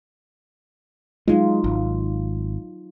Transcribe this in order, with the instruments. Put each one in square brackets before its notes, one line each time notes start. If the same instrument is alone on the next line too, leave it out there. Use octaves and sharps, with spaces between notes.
[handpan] F#3 D#4 F4 [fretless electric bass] G#3
[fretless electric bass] G#1